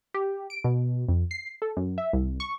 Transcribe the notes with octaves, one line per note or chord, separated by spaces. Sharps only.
G4
D7
B2
F2
C7
A4
F#2
E5
C2
C#6